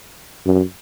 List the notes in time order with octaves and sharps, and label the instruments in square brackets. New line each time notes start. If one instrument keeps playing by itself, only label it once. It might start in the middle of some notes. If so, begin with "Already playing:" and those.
[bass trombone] F#2